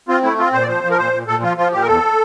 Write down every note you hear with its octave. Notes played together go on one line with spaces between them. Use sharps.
C4 F4
A3 E4
C4 F4
A#2 C5
D5
F3 C5
F3
A#4
A#2 C5
A#2
A#2 A4
F3 F4
F3 F4
A#2 G4
A#4
E2 A4